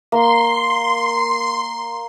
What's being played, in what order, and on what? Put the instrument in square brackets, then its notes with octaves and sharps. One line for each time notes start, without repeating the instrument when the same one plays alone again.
[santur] A#3 [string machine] C6